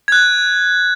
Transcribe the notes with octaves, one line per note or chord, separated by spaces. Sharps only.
F#6 G#6